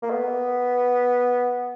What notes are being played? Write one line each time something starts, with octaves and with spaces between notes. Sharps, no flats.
A#3
B3